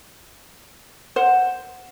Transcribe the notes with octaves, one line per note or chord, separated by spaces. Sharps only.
C5 F#5